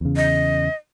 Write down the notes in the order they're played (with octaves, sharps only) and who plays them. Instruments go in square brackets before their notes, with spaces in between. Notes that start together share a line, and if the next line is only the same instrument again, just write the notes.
[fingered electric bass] E2 C#3
[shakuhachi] D#5